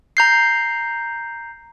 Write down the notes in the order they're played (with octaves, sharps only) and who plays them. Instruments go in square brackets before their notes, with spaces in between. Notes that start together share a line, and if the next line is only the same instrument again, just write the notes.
[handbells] A#5 G6 C7